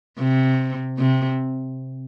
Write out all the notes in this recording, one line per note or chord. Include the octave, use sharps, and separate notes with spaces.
C3
C3